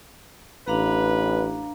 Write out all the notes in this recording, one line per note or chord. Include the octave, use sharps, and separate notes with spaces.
A1 D4 B4 F5 A#5